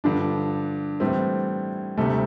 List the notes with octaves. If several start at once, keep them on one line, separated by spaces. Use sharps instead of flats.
G2 D3 F3 D4
A2 E3 G3 C4
D2 C3 G3 A3